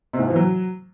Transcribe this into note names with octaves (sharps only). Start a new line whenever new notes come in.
C3
G#2
F3
E3
F#3